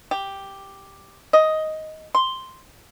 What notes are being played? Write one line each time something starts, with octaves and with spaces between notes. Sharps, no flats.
G4
D#5
C6